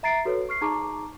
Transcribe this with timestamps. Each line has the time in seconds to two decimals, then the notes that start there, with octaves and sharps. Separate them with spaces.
0.03 E5 A#5 A6 C7 D7
0.25 F#4 A4 B4 C#5
0.49 C#6 F6 C7
0.61 D#4 G#4 A5 A#5 C#6 D6